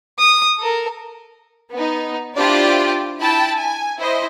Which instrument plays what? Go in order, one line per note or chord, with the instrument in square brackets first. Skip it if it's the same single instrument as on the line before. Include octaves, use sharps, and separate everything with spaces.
[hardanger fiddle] D#6
A4 A#4
[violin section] B3 D#4
D4 E4 F4 G4 C5 D5
E4 G5 A5 B5
G#5
E4 C5 D#5